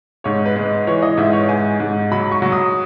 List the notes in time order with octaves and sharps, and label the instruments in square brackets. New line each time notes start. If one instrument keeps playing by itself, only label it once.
[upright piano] G#2 C#5
B4
G#3
E3 C#5
D#5
G#2 E5
C#5
G#2 G#5
G#2
F#3 B5
C#6
F#3
D#6